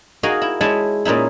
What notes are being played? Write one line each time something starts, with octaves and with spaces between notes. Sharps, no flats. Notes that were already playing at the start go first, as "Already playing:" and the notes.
D#4 F#4 G#4 A#4 D#5 F5
E4
G#3 E4 C#5 A5
A#2 C#4 D#4 E4